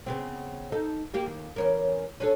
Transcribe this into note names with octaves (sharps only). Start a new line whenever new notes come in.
C#3 B3 C4
D#4 A4
G3 A#3 G4
D#2
E2 C#4 A#4
C#4 D4 A4